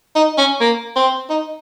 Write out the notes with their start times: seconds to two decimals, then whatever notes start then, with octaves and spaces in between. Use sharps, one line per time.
0.16 D#4
0.38 C#4
0.61 A#3
0.96 C4
1.30 D#4